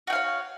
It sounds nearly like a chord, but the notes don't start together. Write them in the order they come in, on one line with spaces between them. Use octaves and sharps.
F#4 G5 F5 C#5